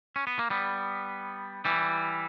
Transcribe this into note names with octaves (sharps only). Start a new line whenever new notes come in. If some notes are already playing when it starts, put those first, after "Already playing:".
C#4
B3
A#3
G3 B3
E3 G3